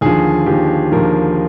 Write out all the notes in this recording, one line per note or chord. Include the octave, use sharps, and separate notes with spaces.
D#2 D3 F3 G#4
D#2 D3 F3 G4
D#2 D3 F3 A#4